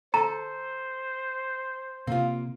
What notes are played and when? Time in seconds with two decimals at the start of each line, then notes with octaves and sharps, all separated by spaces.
0.14 A4 C5 A#5
2.07 C3 A#3 F4